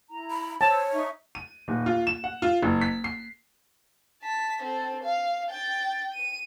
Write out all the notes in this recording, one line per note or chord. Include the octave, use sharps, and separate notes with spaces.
E4 A#5
B5
C5 C#5 A5 E6
D#4 E5 C#6
D#7
D#1
F4
E7
F#5
F4
F#1
B6
C7
A5 B6
C4 A4
F5
G5 A6
D#7